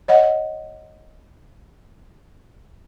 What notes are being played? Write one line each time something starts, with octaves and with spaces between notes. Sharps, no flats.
C#5 D#5 F#5